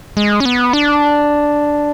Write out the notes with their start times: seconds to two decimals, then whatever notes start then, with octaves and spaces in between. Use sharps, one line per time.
0.17 G#3
0.40 C#4
0.45 B3
0.73 D4